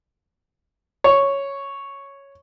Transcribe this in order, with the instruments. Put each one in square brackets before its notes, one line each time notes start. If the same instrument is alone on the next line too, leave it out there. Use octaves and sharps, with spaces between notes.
[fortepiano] C#5